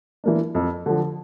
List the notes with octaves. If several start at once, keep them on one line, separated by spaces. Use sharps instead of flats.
E3 A#3 D4
F2
D3 F3